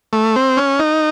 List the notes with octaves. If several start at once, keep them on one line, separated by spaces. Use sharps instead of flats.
A3
C4
C#4
D#4